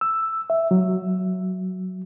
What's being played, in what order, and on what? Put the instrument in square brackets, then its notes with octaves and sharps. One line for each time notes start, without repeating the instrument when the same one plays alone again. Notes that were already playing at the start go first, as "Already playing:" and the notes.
[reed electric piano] E6
E5
F#3